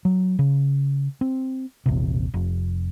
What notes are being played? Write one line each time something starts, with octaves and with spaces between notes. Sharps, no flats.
F#3
C#3
C4
E1 A#1 C3
F1